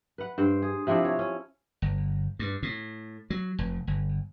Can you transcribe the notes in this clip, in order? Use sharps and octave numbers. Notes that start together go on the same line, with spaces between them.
B4 F#5
G2 C5 G5
G#4
C3 F3 D4 E4
C#5
C#4
G1
G2
A2
F#3
F1
G1